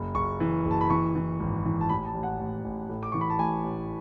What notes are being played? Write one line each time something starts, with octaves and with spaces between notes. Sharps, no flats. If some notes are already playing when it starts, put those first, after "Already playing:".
Already playing: F#1
F#1 C#6
E3
F#1
A5
B5
E3 C#6
E3
G#1
E3
A5
A1 B5
A5
A1
F#5
A1
A1
A2
D6
E3 C#6
B5
A5
A1 G#5
A1